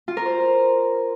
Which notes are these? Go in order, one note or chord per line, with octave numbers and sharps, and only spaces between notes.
F4
A#4
C5